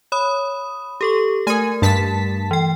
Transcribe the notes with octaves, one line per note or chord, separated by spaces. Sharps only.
C#5 B5 D#6
G4 A4 C#6
A3 A#4 G#5
G2 A5 B6
E3 G5